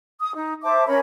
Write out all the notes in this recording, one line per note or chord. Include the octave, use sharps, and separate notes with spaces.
D#6
D#4
C5 E5 A5 D6
C#4 A#4 C#5 B5